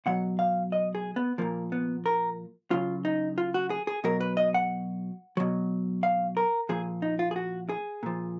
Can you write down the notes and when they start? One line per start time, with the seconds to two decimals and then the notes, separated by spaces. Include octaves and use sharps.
0.06 B2 F#3 F#5
0.39 F5
0.72 D#5
0.95 G#4
1.16 B3
1.38 A#2 F3 A#3
1.72 B3
2.06 A#4
2.71 C#3 F#3 F4
3.05 D#4
3.38 F4
3.54 F#4
3.70 G#4
3.87 G#4
4.04 B2 F#3 A#4
4.21 B4
4.37 D#5
4.54 F#5
5.37 B2 F#3
6.03 F5
6.37 A#4
6.69 A#2 F3 G#4
7.02 D#4
7.19 F4
7.31 G#4
7.36 F#4
7.69 G#4
8.03 A#2 F3